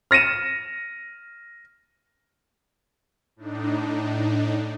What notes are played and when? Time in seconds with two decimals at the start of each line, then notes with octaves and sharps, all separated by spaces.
0.11 F6 A#6 C#7 D#7 E7
3.36 A2 D4 D#4